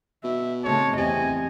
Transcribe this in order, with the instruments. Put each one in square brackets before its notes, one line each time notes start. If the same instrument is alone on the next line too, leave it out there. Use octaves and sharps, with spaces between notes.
[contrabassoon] B2 [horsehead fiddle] E5
[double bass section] C#3 A3 C4 [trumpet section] G#3 C#5 [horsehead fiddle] A5
[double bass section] E2 C4 [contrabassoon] C3 [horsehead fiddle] D#5 [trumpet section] G#5